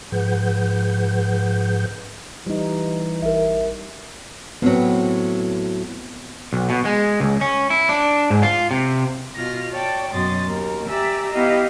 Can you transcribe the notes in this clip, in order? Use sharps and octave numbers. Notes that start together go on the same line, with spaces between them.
G#2 F3 G#4 B4 F#5 G6
E3 G3 D#4
A1 A#4 E5
A2 F#3 B3 C4
B1
B2
G#3
C#2
C#4
E4
D4
G#2
F4
C3
B2 F4 F6 A#6
C#5 D5 G5 A5
F#2 B2 F#3 C6 D#6 A6
D#2 A#4
G4 D5 E5 G#5 A#5 E6
B3 E4 G4 D#5 F5